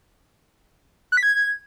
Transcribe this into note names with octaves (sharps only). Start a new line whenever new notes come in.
F#6
B6
G#6